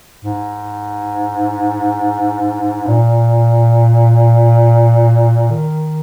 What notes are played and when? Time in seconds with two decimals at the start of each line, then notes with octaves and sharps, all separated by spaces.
0.25 G#2
2.87 A#2
5.51 D#3